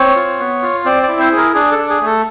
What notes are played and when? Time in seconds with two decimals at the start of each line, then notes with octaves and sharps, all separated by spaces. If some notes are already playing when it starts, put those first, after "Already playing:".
Already playing: C4 C#5
0.16 F4
0.40 B3
0.62 F4
0.85 C4 D5
1.03 D5
1.09 E4
1.20 C5
1.32 G#4
1.37 A#4
1.54 D4 G#4
1.72 A4
1.78 D4
1.90 G#4
2.01 A3 A4